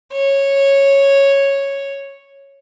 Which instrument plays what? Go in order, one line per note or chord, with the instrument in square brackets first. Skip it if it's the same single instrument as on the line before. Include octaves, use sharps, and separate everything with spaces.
[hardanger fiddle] C#5